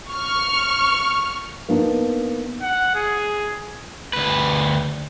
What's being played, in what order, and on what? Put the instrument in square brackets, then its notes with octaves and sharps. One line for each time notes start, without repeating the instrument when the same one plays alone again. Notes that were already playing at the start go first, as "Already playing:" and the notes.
[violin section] C#6 F6
[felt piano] A#3 B3 D4 D#4
[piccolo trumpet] F#5
G#4
[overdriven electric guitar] D2 B4